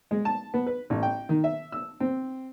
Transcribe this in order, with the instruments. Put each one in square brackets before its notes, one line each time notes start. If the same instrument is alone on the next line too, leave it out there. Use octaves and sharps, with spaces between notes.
[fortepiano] G#3
A5
B3
B4
A1
G5
D#3
E5
E6
C4